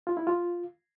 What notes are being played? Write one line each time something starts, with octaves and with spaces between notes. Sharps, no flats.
F4
E4
F4